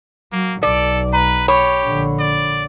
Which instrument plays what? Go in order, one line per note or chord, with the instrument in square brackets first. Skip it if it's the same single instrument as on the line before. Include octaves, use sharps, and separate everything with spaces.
[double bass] F#3 [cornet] A#3
[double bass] B1 [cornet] A4 [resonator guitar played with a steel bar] D5
[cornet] B4 [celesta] A#5
[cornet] G4 [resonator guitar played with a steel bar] C#5 [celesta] B5
[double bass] A#1 D3
[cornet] D5